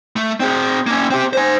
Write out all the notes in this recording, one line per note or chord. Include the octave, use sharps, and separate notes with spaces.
A3
C4 G#4
A#3 C#4
C4 G4
C5 G#5